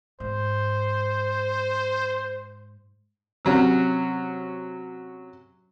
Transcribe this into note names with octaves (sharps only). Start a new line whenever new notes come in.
G#2 C5
C3 F#3 C#4